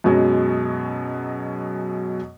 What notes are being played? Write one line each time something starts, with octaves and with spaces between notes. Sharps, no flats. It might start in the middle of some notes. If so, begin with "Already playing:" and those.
F#2 B2 F#3 G#3